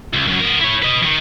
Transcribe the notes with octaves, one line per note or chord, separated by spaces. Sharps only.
C#2
F#2 F#3
B3 A#4
E4 C#5
B4 D#5
D#3 E3